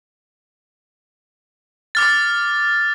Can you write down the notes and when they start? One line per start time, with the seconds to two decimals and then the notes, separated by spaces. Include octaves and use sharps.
1.95 D6 F6 A6